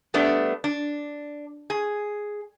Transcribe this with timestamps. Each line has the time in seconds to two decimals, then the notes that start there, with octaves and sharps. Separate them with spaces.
0.14 G3 A3 B3 D4
0.64 D4
1.70 G#4